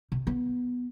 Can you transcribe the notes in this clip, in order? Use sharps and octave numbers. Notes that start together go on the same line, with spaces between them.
C3
B3